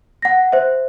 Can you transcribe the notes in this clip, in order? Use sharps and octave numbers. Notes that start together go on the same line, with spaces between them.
F#5 A#6
C5 E5